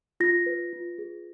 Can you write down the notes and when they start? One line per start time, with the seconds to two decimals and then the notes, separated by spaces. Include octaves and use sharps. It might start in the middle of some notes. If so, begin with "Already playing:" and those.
0.20 F4 A#6
0.46 B4
0.73 F4
0.98 G#4